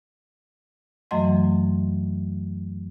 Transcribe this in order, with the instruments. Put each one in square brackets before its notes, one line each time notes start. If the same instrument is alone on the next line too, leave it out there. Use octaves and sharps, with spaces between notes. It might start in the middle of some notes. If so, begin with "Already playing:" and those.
[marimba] F#2 E3 F#3 A3 D#5 C6